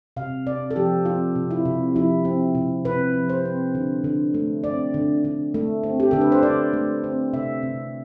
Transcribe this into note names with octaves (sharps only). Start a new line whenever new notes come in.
C3 F5
C3 D5
A4
F3 G4
C4 F4
C3
E4
C3
F3 E4
C4
C3
C3 B4
F3
C5
C4
D3
D3
A3
C4 D5
D3
D3
A3
C4
G4
D3 A4
B4
C5
D3 D5
A3
C4
C3 E5
C3